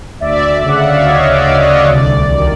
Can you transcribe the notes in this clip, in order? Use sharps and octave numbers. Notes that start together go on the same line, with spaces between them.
D2 D5 E5
C#3
F#5
F5
E5
D2 C#5 D#5
D5
D2
C#5 D#5
C2 D5
D#3